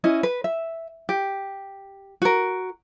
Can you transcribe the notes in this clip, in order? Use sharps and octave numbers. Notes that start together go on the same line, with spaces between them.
C#4 E4 D#5
B4
E5
G4
F#4 A#4